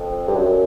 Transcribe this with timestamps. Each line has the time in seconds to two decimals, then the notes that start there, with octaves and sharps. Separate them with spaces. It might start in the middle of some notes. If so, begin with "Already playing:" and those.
Already playing: F2
0.27 G2
0.35 F#2